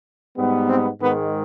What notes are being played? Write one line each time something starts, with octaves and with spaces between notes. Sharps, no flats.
G#2 G3 B3
C4
G#2 D#3 G#3 B3